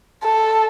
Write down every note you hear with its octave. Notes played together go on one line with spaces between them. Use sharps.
A4